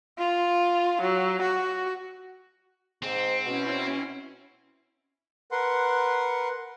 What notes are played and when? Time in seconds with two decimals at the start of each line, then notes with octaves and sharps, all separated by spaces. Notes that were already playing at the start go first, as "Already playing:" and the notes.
0.19 F4
1.01 F#3
1.42 F#4
3.03 G#2 C4
3.45 B2 C#4 E4
5.52 A#4 B4 F#5 C6